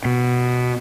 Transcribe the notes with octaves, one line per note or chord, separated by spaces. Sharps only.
B2